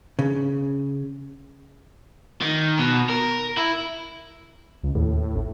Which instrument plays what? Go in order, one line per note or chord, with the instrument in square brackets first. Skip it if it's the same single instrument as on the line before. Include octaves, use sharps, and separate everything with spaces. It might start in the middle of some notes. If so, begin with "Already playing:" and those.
[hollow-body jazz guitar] C#3
[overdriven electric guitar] D#3
B2
A#4
E4
[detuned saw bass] C#2
[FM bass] D#2 [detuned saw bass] A2
[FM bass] A1